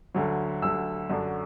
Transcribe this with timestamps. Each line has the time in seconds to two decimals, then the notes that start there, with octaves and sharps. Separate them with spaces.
0.15 D2 D3 F#3
0.62 D2 D3 F#3 E6
1.10 F#2 D3 F#3 D4